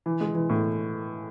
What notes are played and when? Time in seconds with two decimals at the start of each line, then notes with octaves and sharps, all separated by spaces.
0.06 E3
0.21 G#3
0.35 E3
0.49 A2